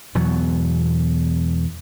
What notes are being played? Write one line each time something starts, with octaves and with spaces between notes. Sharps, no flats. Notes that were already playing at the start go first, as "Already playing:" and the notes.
E2 B2 F#3